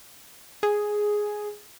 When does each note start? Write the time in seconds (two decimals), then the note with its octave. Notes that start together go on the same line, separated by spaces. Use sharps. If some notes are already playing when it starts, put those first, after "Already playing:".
0.63 G#4